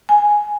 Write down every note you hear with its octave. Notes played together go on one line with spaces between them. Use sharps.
G#5